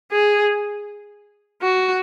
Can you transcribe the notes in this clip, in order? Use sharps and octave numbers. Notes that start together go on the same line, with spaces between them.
G#4
F#4